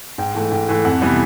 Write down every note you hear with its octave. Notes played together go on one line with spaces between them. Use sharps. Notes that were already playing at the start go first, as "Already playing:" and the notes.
G#2 G5
E3 A3
G#2 G5
E3 A3
F2 F#5
C3 E3 G3 B3